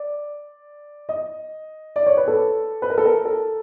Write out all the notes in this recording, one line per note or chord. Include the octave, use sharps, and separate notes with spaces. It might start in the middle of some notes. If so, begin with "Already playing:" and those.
Already playing: D5
D#5
D5
C#5
B4
A4
B4
A#4
A4
A#4
A4